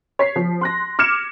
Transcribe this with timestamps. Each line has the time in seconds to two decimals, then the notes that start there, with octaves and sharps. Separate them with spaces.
0.19 C#5 B6 C7
0.36 F3
0.61 C6 F#6 A#6
0.99 D6 F6 G#6 C#7 E7